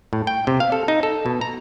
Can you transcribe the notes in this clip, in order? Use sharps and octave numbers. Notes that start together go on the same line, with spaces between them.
A2
G5
C3
F5
A4
D#4
A4
B2
A#5